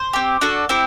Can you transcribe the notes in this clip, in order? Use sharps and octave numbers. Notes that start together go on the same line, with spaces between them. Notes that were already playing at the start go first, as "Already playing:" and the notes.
Already playing: C5
C4 G4
D4 F#4 A4
C4 E4 G4